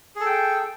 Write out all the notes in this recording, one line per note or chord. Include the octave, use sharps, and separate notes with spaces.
G#4 A4 G5